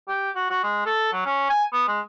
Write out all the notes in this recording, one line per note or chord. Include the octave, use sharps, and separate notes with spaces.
G4
F#4
F#4
G#3
A4
F#3
C#4
G#5
B3
G#3